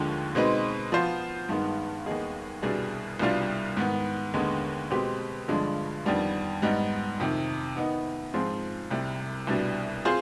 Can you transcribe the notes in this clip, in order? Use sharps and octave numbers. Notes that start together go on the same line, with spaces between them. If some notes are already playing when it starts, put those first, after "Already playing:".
Already playing: D#2 D3 F3 G#3
B2 G#3 C4 D#4 B4
F3 B3 F4 C5
G2 D#3 G#3 B3
D#2 D#3 B3 D#4 G#4
C2 B2 G3 D4 G#4
C2 B2 G3 D4 F4
G#2 D#3 B3
D#2 D3 G#3 B3
B2 G#3 C4 G4 B4
G2 D3 F3 G#3 D4
F2 D#3 G3 B3 D4
G#2 G3 B3 D#4
F2 C3 D#3
D#3 B3 D#4
G#2 F3 C4 F4 G#4
C2 C3 G3
C2 B2 G3 D4
C4 F4 G#4 C5